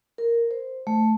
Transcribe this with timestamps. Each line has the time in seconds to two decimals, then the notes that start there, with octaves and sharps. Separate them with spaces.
0.18 A#4
0.51 C5
0.87 A3